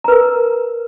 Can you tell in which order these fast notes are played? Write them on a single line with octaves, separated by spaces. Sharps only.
A#5 B4 A#4